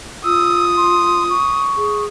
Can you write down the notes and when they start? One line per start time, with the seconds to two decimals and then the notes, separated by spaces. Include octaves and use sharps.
0.24 F4 D#6 E6
0.77 C6
1.30 C#6
1.77 G#4